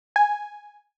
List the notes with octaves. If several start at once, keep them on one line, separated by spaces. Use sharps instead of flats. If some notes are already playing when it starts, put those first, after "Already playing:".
G#5